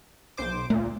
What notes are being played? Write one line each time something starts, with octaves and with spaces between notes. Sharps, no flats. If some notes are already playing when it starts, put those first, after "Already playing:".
B1 C5 D6
D2 A#2 A3